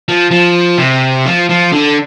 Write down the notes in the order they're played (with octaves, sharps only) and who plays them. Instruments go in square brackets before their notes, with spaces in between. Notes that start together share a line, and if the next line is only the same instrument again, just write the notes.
[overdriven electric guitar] F3
F3
C3
F3
F3
D3